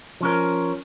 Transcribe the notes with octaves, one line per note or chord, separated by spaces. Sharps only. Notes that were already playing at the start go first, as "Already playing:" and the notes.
F3 C#4 A#4